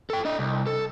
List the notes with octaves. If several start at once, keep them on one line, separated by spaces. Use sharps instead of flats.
A4 G5
D4 D#5
C2
A4